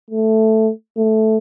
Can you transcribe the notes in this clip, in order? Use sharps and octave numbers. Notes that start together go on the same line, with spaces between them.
A3
A3